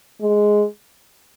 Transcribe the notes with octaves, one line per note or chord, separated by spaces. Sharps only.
G#3